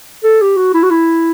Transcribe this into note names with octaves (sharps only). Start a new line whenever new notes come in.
A4
G4
F#4
E4
F#4
E4